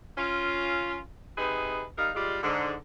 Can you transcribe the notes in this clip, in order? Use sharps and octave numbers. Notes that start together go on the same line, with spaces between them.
C#4 F4
C3 D#4 G#4 B4
G3 D#4 A#4 F5
G3 G#3 F4 D5
G#2 D3